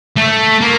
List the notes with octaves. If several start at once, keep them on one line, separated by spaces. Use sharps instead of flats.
A3
A#3